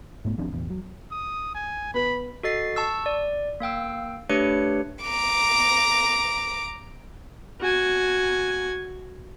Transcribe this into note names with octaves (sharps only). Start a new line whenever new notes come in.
G#2 A3 B3
D#2 F3 C4 D4
E1 A1 E2
F#3
D#6
G#5
B3 B4 B5
F#4 A4 D#5 A6 C7
A5 C#6 E6
D5
A#3 F5 G5 E6
A3 D4 G4 B4 C#5 C#7
A#5 D6
F#4 G#5